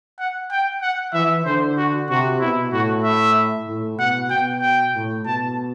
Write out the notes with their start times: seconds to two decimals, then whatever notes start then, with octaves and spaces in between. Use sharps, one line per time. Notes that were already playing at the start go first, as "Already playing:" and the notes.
0.19 F#5
0.51 G5
0.82 F#5
1.14 E3 E5
1.45 D3 C5
1.77 F#4
2.09 C3 F#4
2.40 B2 E4
2.72 A2 F#4
3.04 E5
3.68 A2
3.98 B2 F#5
4.30 B2 G5
4.62 G5
4.94 A2
5.25 B2 A5